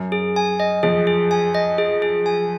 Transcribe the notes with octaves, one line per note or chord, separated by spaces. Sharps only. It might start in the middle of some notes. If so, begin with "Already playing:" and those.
Already playing: F#2
G#4
G#5
D#5
F2 G#4
G#4
G#5
D#5
G#4
G#4
G#5